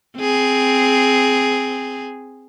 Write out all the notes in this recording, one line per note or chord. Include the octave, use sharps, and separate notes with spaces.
C4 G#4